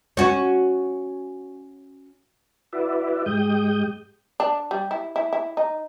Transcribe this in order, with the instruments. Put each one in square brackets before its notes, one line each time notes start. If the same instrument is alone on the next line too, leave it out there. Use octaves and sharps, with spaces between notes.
[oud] C#4 F#4
[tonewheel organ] E4 F#4 B4 D5 E5
G#2 G#3 G4 D#6 G6
[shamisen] D4
G3
E4
E4
E4
D#4